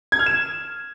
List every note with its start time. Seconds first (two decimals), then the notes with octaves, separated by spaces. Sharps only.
0.12 G#6
0.19 F6
0.26 E7